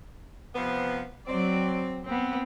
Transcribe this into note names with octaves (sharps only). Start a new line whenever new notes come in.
C3 F3 B3
F#3 C4 D5
B3 C4